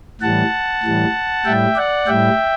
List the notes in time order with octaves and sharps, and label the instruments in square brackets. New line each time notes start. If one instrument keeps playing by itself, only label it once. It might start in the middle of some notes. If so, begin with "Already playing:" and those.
[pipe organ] A2 E3 G3 F#5 A5
A2 E3 G3
A2 G3 E5 G5
D5 F#5
A2 G3 E5 G5